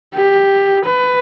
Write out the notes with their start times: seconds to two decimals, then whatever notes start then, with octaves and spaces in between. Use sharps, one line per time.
0.15 G4
0.86 B4